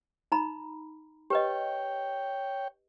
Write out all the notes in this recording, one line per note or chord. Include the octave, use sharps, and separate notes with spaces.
D#4 A#5 B5
G4 B4 C#5 D#5 G5